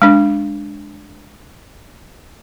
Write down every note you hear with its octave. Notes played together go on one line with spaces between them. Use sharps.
G#3 D4